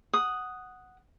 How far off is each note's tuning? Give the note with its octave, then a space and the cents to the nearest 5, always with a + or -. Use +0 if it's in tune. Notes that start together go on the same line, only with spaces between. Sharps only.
F#5 +0 D#6 +0